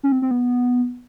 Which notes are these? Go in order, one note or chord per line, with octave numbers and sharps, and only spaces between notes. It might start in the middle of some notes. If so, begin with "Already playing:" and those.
C#4
C4
C4
B3